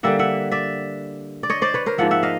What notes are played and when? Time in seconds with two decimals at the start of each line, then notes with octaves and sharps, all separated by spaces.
0.03 D3 G3 A#3 E5 F#5
0.19 E5 F#5
0.51 D5 E5
1.43 D5
1.50 C#5 D#5
1.62 C5 D5
1.74 B4 C#5
1.86 A#4 C5
1.98 G#2 F3 A#3 E5 F#5
2.11 E5 F#5
2.23 D#5 F5